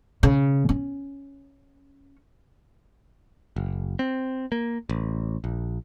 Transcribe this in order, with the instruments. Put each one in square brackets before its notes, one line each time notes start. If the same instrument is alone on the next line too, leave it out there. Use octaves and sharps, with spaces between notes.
[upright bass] C#3
C#4
[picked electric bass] F#1
C4
A#3
A1
A#1